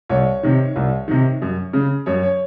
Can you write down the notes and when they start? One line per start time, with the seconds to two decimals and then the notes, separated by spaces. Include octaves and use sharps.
0.09 C2 C#5
0.43 C3 D#3
0.76 C2
1.08 C3 D#3
1.42 F#2
1.73 C#3
2.06 F#2 C#5
2.23 C#5